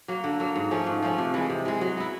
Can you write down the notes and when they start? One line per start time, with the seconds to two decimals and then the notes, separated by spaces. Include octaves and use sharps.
0.08 F#3 A#3
0.24 D3
0.40 F#3 A#3
0.56 G#2
0.71 F3 A3 C#4
0.87 G#2
1.02 F3 A3 C#4
1.18 C3
1.34 E3 G#3
1.50 C3
1.65 E3 G#3
1.81 F#3
1.97 B3 E4